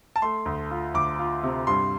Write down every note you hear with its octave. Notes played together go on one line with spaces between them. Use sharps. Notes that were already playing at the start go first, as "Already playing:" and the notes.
A5
A3 C6
D2
F4
D2 D6
F4
C3
G2 C6